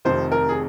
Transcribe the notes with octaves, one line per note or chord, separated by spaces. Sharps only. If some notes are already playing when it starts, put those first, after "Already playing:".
F1 F2 C3 D#3 C5
A#4
G#4